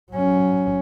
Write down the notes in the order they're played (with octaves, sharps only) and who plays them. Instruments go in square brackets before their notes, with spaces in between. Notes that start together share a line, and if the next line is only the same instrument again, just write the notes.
[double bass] F#3 C#4